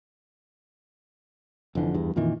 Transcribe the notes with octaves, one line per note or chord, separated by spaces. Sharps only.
F1 F2 D3 E3
E2 G2
F2 A#2 D#3 E3